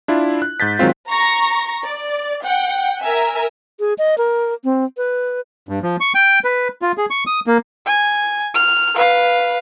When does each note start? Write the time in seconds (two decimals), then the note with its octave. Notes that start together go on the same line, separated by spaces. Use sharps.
0.08 D4 E4 F4
0.42 F#6
0.60 G#2 G6 A6 B6
0.79 D#3 F#3 G#3 C4 F4
1.08 A#5 C#6 A#6
1.84 D5
2.44 F#5 G5
3.01 A#4 E5 G#5
3.80 G#4
3.98 D#5
4.18 A#4
4.64 C4
4.97 B4
5.69 G2
5.82 F3
6.00 C#6
6.15 G5
6.44 B4
6.82 F4
6.98 G#4
7.10 C#6
7.27 D#6
7.47 A#3
7.86 G#5
8.54 F6
8.95 B4 F5